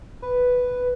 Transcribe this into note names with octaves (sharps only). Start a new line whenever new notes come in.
B4